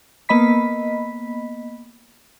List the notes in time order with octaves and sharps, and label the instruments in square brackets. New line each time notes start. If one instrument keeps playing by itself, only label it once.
[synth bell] A#3 B3 D#5 B5 B6